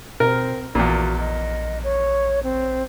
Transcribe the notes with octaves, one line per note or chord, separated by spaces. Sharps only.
B2 C4 A#4
A#1 E2 A#2 F#4
D#5
C#5
C4